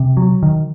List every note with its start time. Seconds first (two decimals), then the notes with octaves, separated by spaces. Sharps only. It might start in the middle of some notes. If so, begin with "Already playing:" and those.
Already playing: C3
0.17 F#3
0.43 D#3